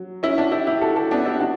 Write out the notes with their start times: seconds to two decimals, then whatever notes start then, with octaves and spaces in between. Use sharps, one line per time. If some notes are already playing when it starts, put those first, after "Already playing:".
Already playing: F#3
0.23 C#4 E4
0.38 D4 F#4
0.52 E4 G4
0.67 E4 G4
0.81 F#4 A4
0.96 F#4 A4
1.11 B3 D4
1.25 E4 G4
1.40 D4 F#4